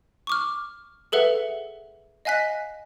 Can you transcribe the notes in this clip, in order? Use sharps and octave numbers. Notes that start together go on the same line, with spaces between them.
C#6 D6 F6
G#4 A4 B4 E5 F#5
D#5 F5 G#5 F#6 B6